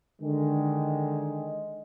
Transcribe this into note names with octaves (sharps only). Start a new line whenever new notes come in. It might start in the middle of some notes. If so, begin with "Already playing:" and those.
D3 D#3 G#3